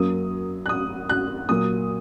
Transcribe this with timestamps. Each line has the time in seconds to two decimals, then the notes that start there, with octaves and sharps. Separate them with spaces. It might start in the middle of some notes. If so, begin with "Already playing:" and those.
Already playing: F#2 F#3 A#3 D#6
0.66 F#6
0.69 D#6
1.09 F#6
1.49 A#2 F#3 A#3 D#6